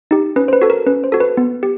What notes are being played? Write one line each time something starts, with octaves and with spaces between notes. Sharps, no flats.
D#4 G4
C#4 B4
C5
B4
F#4 A4
A#4
C#4 B4
C5
F#4 A4
B4
B3
G4